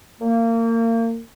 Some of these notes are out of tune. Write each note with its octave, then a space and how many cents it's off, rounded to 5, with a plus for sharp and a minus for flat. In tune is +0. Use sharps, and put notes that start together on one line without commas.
A#3 -30